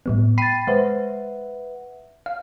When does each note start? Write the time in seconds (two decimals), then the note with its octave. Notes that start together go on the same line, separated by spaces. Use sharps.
0.06 A2 G3 B3
0.38 G5 B5 A6 C7 D#7
0.67 G#3 B4 C5 E5 F#5
2.26 F5